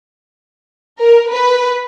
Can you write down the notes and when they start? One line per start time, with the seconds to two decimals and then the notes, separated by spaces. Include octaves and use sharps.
1.00 A#4
1.32 B4